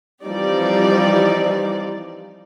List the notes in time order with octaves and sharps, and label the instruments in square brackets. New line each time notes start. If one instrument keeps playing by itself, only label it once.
[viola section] E3 F3 G3 C4 D#4 D5